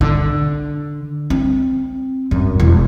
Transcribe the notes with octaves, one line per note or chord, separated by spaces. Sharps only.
D3
C4
F#2
E1